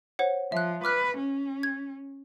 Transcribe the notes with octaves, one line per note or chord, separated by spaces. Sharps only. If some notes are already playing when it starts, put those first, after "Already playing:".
C5 C#5 F#5
F3 E5 F#6
B4 D6 F6 F#6
C#4
G#6